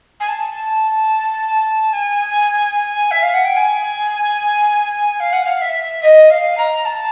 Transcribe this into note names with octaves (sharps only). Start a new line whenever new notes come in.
G#5
A5
G#5
E5
F5
F#5
G5
G#5
F5
F#5
F5
E5
D#5
F5
A#5
A5